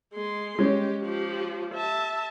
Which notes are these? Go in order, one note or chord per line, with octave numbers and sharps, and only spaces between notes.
G#3 C6
G#3 C#4 G4
F3 G4
E5 A5